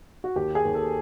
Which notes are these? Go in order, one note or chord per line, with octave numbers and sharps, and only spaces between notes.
F#4
D#2 G4
G#4
D#2
A4